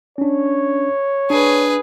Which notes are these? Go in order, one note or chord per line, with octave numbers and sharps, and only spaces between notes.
C#4 D4 C#5
D4 G#4 B4